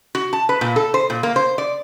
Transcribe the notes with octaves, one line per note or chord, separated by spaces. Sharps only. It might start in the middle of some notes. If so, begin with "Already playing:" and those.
F#4
A5
B4
A#2
A4
C5
A#2
A#3
C5
D5